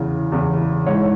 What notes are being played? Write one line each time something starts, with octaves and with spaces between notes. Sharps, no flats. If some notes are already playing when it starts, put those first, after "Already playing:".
Already playing: E2 C#3 E3
E2 C#3 E3
G#2 E3 C#5